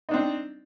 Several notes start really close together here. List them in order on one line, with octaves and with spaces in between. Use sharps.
D#4 D4 C4